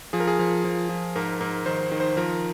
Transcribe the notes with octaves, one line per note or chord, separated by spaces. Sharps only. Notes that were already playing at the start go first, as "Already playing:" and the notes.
F3 G#4
A#4
G#4
F3
F3
F3
G#2 A#4
G#2 A#4
D#3 C5
D#3
C5
F3 A#4